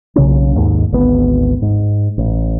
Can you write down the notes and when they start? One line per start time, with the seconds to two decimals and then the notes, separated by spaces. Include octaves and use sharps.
0.16 B1 C#3 A#3 C#4
0.56 D#2 G#2
0.92 G#1 D2 B3
1.62 G#2
2.18 A1